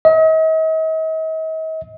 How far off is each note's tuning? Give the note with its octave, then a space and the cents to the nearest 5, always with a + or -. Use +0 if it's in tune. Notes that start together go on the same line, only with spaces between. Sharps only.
D#5 +40